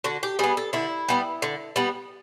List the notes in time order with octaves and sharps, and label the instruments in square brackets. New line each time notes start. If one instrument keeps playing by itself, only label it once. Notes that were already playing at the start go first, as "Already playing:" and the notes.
[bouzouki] D3 F#4
G4
G3 B3 G#4
A4
D3 E4
G3 B3
D3
G3 B3